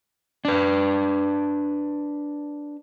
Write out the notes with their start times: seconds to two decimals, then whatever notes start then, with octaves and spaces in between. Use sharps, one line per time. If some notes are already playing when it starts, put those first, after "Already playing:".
0.45 D4 B4